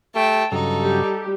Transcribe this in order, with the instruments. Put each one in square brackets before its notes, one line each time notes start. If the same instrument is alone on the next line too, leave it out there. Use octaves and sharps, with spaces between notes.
[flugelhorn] A3 [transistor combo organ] G4 [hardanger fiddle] G5 A5
[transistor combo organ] G2 C#3 F#3 [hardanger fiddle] D#4 [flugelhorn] A4
[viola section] G3 G4